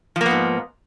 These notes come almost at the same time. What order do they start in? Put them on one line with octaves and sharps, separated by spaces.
F3 A#3 B3 G#2